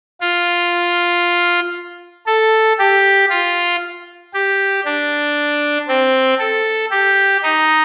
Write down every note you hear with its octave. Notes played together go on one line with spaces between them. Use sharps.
F4
A4
G4
F4
G4
D4
C4
A4
G4
D#4